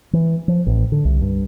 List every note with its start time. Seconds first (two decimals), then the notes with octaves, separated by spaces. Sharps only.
0.13 E3
0.48 F3
0.67 A1
0.92 D3
1.05 C2
1.22 G2